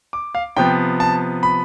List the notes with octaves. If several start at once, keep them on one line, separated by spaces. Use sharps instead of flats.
D6
F5
C3 F3 B3 G5
A5
B5